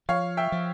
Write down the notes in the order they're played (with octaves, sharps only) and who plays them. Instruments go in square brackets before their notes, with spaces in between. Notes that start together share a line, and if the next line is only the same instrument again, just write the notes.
[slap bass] F3 [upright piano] C#5 F5
[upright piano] E5 G5
[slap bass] F3